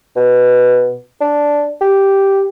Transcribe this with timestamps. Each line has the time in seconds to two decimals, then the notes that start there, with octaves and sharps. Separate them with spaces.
0.17 B2
1.21 D4
1.81 G4